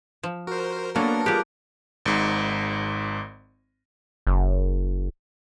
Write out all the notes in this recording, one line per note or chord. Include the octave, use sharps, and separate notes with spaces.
F3
F#4 A#4 C5
F#3 A#3 B3 D4 A4 A#4
G3 F4 G4 G#4 D6 F#6
G#1 G#2
F#1